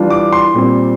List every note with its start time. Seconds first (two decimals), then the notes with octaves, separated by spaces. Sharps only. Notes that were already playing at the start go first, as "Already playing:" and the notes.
Already playing: E3 G3 D4 F4
0.10 D6
0.33 C6
0.54 A#2 G3 C4